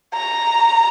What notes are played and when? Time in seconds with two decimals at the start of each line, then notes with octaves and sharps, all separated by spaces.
0.14 A#5